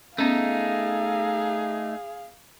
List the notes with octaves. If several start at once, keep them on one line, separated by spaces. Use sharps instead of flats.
A3 B3 C#4 D#4 G#4 F5